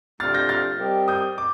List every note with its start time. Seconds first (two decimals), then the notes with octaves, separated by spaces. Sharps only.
0.19 C3 F3 A3 D4 F4 F6 A6
0.34 G6 A#6
0.49 F6 A6
0.78 G3 C4 G4 A#4 D#5
1.08 D#6 G6
1.38 D6